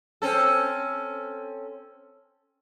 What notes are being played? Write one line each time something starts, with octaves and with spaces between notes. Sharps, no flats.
C4 C#4 A4